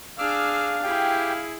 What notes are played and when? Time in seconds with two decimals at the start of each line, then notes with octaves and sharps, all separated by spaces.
0.18 D4 G#4 F5 D6 E6 F6
0.84 E4 G4 G#4 G5